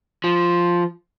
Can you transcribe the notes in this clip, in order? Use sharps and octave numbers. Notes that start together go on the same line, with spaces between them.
F3